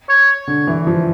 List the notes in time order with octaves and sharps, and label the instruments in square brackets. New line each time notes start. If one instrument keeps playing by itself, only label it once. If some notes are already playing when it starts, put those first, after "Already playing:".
[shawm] C#5
[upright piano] D3
E3
F3